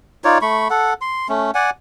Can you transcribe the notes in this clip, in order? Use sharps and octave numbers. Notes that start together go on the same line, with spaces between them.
D#4 F4 C#5 D5
A3 B5 C#6
A4 F#5
C6
A3 C#4
D5 F#5 G#5